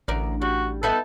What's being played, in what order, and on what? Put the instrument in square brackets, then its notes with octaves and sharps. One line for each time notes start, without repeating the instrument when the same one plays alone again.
[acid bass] A1 [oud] D2 A#4 D5
[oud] G3 [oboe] F#4
[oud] B3 D#4 E5 [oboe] A4